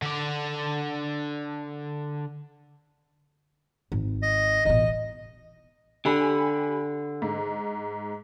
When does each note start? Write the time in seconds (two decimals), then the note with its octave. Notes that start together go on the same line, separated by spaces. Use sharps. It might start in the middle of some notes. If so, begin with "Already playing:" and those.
0.02 D3 D5
3.92 G#1
4.22 D#5
4.65 A1 B2 D#5
6.05 D3 G4 G#5 B5
7.22 G#2